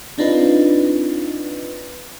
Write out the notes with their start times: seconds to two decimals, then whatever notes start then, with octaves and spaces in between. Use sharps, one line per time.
0.18 C4 D4 D#4 F4 B4